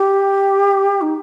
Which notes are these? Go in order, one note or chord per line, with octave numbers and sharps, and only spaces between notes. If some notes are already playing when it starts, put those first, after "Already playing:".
Already playing: G4
D#4